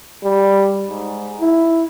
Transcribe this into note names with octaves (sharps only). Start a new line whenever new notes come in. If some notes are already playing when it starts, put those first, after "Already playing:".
G3
G#2
E4